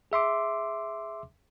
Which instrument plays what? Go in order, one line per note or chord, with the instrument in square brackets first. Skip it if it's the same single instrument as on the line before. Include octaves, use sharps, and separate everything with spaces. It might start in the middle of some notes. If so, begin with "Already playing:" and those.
[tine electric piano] G#4 E5 C6 D6